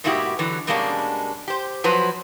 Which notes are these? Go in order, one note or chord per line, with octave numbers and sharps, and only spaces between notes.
G#2 B2 A#3 E4 F#4 G4
D3 E3 F#3
B2 G3 G#3 A#3 C#4 D4
G4 C5
F3 F#3 B4 C5